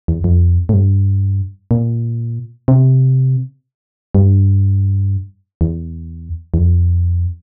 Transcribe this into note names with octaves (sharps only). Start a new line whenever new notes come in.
E2
F2
A2
G2
A#2
C3
G2
E2
E2
F2